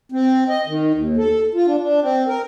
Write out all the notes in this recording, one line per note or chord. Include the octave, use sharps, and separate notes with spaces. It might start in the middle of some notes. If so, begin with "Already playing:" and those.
C4
D#5
D#3
D#2
A4
F4
D4
D4
C4
A#4